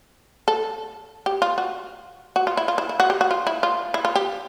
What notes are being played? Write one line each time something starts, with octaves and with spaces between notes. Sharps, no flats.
A4
G4
F4
F#4
F#4
F4
E4
F4
E4
E4
F#4
G4
F#4
F4
E4
F4
E4
F4
G4